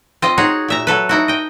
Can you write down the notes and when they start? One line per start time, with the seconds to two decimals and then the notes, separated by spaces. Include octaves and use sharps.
0.22 C4 F4 D#5
0.38 D#4 F#4 G#4 C#5
0.68 A#2 E5 A#5
0.87 F#3 A4 B4
1.09 D#4 E4 F#4
1.28 D#5 G5